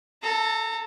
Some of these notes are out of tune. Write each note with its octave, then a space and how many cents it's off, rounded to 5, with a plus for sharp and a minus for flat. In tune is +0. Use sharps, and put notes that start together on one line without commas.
A4 +0 A#5 -35